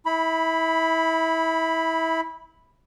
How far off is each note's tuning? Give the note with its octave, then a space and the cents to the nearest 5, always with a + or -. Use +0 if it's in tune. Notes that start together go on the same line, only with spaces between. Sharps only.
E4 -25 B5 +0